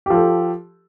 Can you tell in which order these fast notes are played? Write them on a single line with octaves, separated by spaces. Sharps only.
G4 F3 A4